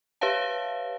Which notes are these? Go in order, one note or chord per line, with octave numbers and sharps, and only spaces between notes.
G4 B4 C#5 E5 F5 A5